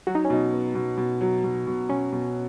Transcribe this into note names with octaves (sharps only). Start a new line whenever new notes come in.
F#3 F#4
D#4
C#4
B2 D#4
B3
B2
B2
F#3
B2
B2
B2 C#4
B2